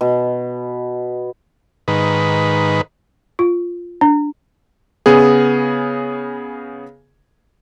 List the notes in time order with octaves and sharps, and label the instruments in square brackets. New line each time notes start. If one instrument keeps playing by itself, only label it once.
[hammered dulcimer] B2
[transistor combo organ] G#2 D#3 B4
[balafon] F4
D4
[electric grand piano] C#3 B3 G#4